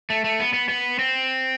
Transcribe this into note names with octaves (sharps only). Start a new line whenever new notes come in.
A3
A3
B3
B3
B3
C4